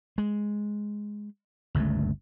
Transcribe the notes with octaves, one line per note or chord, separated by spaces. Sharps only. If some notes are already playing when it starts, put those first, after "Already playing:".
G#3
G1 C#2 G2 A3